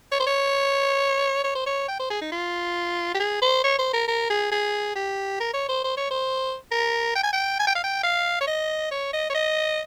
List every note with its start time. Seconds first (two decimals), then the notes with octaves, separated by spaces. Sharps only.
0.12 C#5
0.20 C5
0.27 C#5
1.44 C#5
1.55 C5
1.67 C#5
1.88 G5
2.00 C5
2.10 G#4
2.22 D#4
2.32 F4
3.14 G4
3.20 G#4
3.42 C5
3.64 C#5
3.79 C5
3.93 A#4
4.08 A#4
4.30 G#4
4.52 G#4
4.96 G4
5.40 A#4
5.54 C#5
5.69 C5
5.84 C5
5.97 C#5
6.11 C5
6.72 A#4
7.15 G5
7.24 G#5
7.33 G5
7.60 G#5
7.67 G5
7.75 F5
7.84 G5
8.04 F5
8.41 C#5
8.47 D#5
8.91 C#5
9.13 D#5
9.30 C#5
9.35 D#5